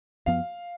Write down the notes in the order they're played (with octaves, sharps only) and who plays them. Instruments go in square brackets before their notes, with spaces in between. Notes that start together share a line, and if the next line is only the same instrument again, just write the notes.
[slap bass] F#2 F3 B3 [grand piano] F5